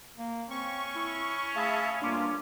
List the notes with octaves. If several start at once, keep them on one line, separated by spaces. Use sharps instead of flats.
A#3
C4 C#4 C#6
E4
A3 G#4 E5 F5 A5 B5
G2 A#3 D4 F4 D6